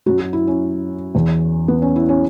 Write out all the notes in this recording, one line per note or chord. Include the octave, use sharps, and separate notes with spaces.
F#2 F#3 F#4
F#4
E4
C#4
E2 E3
B3
C#4
E4
C#4